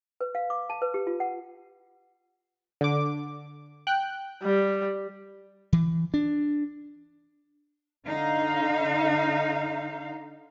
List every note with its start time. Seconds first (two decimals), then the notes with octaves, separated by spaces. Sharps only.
0.21 B4
0.35 F5
0.50 D6
0.70 A5
0.82 B4
0.94 G4
1.07 F4
1.20 F#5
2.81 D3 D6
3.87 G5 F#6
4.43 G3
5.73 E3
6.14 D4
8.07 D3 D#4 F5